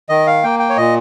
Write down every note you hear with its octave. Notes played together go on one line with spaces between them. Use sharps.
D#3 D#5
F5
A#3 G5
G5
C#5
A#2 D#5